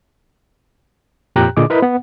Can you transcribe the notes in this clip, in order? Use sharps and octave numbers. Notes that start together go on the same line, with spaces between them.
F2 A#2 G4 G5 A#5 F#6
A#2 D3 G#4 D#5 D6
E4 A#4 B4 D#5 B5
B3 F#5